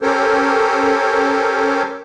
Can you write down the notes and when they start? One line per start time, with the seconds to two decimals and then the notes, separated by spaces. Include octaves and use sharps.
0.02 C#4 G4 A4 A#4 C5 C#5